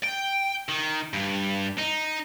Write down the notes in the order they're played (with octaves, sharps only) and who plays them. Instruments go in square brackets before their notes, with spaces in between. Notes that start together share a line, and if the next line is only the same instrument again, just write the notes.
[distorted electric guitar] G5
D#3
G2
D#4